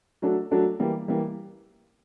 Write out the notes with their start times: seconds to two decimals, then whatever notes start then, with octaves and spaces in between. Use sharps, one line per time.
0.22 F#3 A3 D4 F#4 A4
0.51 F#3 A3 D4 F#4 A4
0.79 E3 G3 A#3
1.08 E3 G3 A#3